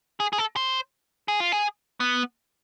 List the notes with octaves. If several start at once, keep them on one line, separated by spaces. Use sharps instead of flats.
G#4
G#4
A4
C5
G#4
F4
G#4
B3